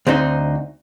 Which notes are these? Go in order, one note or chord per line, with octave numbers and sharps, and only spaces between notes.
D2 C4 D#4